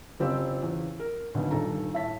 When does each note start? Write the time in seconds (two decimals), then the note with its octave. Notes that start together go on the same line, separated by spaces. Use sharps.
0.20 F#1 C4 F4 G4 E6
0.61 E2 C#3
1.00 A#4
1.34 G#1 D2 B2 D#3 F#3
1.51 D#1 G2 D#3 A4 A#5
1.93 A2 E5 A5 B6